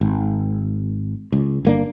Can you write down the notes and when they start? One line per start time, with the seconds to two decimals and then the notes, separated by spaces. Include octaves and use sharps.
0.01 G#1
1.32 C#2
1.65 G1 A#3 D4